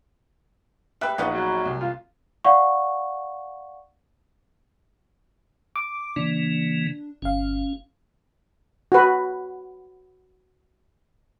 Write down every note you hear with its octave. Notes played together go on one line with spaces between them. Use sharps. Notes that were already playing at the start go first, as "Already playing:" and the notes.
G3 B4 E5 G5 F#6
A#1 G#3 B3 D#4 F5 C#6
F#3
C2
F4
D5 F5 F#5 C#6
D6
C#3 E3 A#3 D4
G1 C#4 F5
F#4 B4